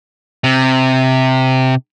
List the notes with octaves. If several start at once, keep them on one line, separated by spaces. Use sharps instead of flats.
C3